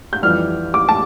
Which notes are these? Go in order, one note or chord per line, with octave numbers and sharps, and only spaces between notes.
G6
F2 E3 G3 F6
D6
A5